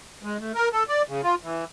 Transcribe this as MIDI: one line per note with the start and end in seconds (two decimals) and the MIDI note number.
0.23 0.37 56
0.40 0.52 57
0.55 0.69 70
0.73 0.83 69
0.88 1.02 74
1.08 1.21 49
1.23 1.35 65
1.43 1.64 52